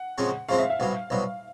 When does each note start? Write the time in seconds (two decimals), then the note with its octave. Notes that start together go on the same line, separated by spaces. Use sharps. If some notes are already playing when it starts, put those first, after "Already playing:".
Already playing: F#5
0.18 C#3 F3 G#3 C4
0.49 C#3 F3 G#3 C4 F5
0.58 E5
0.70 E5
0.79 C2 B2 F#3 F5
1.10 C2 B2 F#3